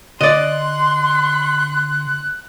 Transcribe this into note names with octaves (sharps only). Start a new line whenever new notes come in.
D3 D5 D#5 C6 F#6